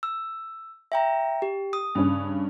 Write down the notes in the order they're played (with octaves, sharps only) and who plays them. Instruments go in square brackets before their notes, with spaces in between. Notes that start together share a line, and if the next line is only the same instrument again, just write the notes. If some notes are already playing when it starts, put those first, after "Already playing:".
[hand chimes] E6
E5 G5 A#5
G4
D#6
[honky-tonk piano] G2 C#3 C#4